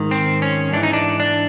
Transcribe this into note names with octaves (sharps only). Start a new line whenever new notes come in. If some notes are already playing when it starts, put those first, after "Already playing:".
Already playing: G#2 D#3
C4
C#4
G#2 E3 D4
D#4
D4
D4